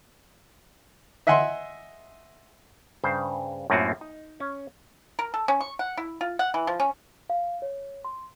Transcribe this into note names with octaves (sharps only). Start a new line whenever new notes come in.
D#5 E5 F#5 G#5 C6
G2 C#3 C5
F#2 A2 A#3 C4 F4 F#4
D#4
C#4
A#4
A4
C#4
C#6
F#5
E4
F4
F#5
E3
F3
C#4
F5
C#5
C6